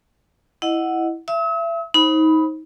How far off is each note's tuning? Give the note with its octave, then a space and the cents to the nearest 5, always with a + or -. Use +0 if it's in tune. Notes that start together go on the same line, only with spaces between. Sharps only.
E4 +0 D#5 +0 F#5 +0
E5 +30 E6 -45
D#4 +25 C5 +30 B5 +0